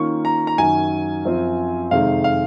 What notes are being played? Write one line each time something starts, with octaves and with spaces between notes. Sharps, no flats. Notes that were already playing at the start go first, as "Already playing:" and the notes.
Already playing: D#3 A#3 C#4 F4 C#6
A#5
A#5
F#2 D#3 F#3 G#5
F#2 F3 C4 F4
F2 C3 D#3 G#3 F5
F5